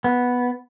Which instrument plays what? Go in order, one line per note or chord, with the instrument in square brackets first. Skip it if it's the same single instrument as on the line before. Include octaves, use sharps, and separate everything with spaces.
[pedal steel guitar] B3